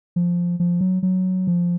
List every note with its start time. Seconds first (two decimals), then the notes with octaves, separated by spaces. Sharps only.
0.16 F3
0.60 F3
0.81 F#3
1.03 F#3
1.47 F3